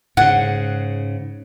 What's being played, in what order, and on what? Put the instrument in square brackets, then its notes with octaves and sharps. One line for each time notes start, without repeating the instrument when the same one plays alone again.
[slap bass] G#2 C#3 [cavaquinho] F#5